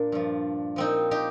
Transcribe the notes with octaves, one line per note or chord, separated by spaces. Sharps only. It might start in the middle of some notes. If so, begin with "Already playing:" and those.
Already playing: A#2 A#3 D4
G2 F3
A#2 F3 C4 D#4
D#4 G4